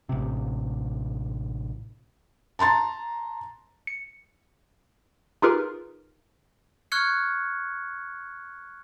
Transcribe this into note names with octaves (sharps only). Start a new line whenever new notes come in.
A1 C3
A5 A#5 C6 A6
C#7
D#4 F4 G4 G#4 A#4 B4
C#6 F6 F#6 G#6 C#7